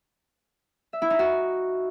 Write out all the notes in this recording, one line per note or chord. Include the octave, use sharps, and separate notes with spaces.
E5
E4
D#4
F#4